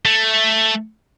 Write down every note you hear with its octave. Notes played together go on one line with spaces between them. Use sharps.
A3